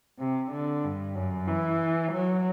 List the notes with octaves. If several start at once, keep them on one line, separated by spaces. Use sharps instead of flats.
C3
D3
G2
F#2
E3
F#3